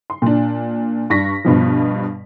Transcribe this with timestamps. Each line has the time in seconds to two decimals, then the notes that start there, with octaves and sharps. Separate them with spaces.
0.10 C6
0.22 A#2 D4
1.10 G2 D4 C#6 A#6 B6
1.45 G2 B2 F3